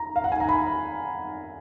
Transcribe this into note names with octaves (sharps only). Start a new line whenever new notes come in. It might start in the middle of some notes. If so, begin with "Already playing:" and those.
Already playing: A#5
F5
F#5
G#5
A#5
B5